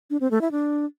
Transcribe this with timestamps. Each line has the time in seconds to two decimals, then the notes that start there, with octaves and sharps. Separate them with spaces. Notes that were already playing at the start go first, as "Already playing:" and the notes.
0.10 D4
0.21 C4
0.31 A3
0.41 E4
0.52 D4